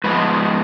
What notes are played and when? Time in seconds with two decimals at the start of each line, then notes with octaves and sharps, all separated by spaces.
0.04 G#2 F3 G#3 B3 B4